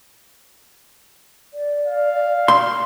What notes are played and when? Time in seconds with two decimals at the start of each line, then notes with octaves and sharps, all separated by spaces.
1.54 D5
1.86 F5
2.48 C6